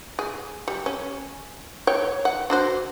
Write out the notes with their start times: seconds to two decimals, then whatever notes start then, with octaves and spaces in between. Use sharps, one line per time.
0.19 G#4
0.68 G3
0.86 C#4
1.87 C#5 G5
2.25 F#5
2.50 D4 F#4 C5